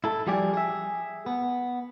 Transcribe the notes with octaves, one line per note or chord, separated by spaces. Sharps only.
E4 A4
F3 G3 F4 G4 G#4 D5
G#4 E5
B3